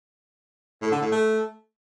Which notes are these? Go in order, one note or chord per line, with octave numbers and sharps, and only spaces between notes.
A2
D3
A2
A3